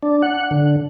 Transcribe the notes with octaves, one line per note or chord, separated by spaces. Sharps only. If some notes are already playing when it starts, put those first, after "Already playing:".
D4
F#5
D3